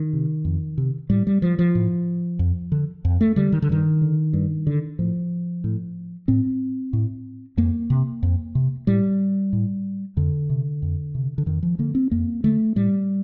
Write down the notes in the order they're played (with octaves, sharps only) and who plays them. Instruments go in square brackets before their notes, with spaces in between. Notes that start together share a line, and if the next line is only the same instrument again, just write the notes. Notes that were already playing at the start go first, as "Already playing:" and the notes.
Already playing: [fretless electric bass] D#3
C3
F2
C3
A2 G3
G3
F3
F3
A2
F2
D3
F2
A3
D3 G3
D#3
D3
G2 D#3
D3
G2
D3
A2 F3
A2
A2 C4
A2
F2 A#3
C3
F2
C3
A2 G3
A2
F2 D3
C3
F2
C3
D3
F2 D#3
F3
D3 A#3
C4
F2 A#3
D3 A3
A2 G3